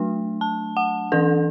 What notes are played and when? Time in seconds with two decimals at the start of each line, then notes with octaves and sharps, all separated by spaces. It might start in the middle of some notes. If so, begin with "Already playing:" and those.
Already playing: F#3 A3 D4
0.41 A5
0.77 F#5
1.12 E3 D4 A4